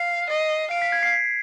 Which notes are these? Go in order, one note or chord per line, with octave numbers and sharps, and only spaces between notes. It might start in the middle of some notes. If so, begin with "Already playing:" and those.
Already playing: F5 C7
D#5
F5 D7
B6
G#6
C7
B6